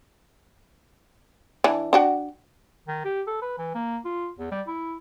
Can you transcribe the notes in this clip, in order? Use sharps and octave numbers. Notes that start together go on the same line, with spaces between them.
E3 D4
D4 F#4 G5
D#3
G4
A4
B4
E3
A#3
F4
E2
G3
E4